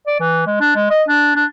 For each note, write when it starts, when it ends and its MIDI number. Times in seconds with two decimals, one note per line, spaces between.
0.07 0.15 74
0.20 0.45 52
0.47 0.57 56
0.60 0.74 62
0.76 0.86 56
0.90 1.03 75
1.08 1.33 62
1.35 1.45 62